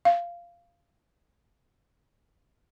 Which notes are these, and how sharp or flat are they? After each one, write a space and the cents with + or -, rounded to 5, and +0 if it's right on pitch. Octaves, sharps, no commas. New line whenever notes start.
F5 -15